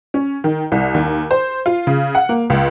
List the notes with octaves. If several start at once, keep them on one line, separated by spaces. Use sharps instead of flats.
C#4
D#3
C2
D#2
C5
F4
C#3
F#5
A#3
C#2